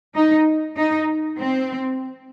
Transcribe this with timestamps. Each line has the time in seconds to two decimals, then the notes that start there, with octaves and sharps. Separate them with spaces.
0.15 D#4
0.77 D#4
1.39 C4